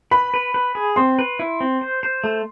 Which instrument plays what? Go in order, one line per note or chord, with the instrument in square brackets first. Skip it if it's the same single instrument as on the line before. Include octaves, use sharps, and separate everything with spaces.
[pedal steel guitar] B4 [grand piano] B5
[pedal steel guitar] B4
B4
G#4
[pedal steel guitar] C4 [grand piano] C6
[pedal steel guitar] B4
E4
C4
C5
C5
A3